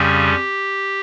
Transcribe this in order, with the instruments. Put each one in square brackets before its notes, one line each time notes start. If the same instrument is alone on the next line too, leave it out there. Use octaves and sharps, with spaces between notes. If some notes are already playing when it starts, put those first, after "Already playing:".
Already playing: [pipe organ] F2 C#3 G3 C#4 G4